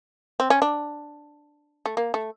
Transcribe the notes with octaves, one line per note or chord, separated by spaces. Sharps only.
C4
C#4
D4
A3
A#3
A3